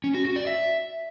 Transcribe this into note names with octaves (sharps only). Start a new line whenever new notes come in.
C#4
F#4
F#4
D5
E5